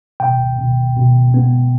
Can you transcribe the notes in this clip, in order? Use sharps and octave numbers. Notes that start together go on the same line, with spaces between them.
B2 G5
B2
B2
B3